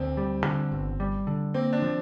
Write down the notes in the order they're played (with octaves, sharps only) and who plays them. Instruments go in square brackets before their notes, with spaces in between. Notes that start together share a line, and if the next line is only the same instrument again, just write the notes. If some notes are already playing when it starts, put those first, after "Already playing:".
Already playing: [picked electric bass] D2 [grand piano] C4
[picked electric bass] G3
D3
G1
G3
D3
[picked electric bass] A#3 [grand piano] C4
[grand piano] D4
[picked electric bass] F3